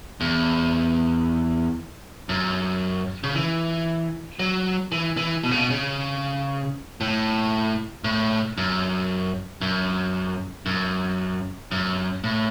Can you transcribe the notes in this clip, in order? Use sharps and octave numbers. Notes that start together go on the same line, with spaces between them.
E2
F#2
C#3
E3
F#3
E3
E3
B2
C#3
B2
C#3
A2
A2
F#2
F#2
F#2
F#2
A2